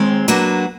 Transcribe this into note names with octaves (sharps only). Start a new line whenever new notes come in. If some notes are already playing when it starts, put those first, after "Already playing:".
Already playing: D#2 D#3 G#3 C4
F#3 A#3 D4 F#4 B4